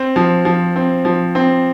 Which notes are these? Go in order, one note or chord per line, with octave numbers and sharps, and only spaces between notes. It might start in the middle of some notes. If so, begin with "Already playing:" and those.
Already playing: C4
F3
F3
C4
F3
C4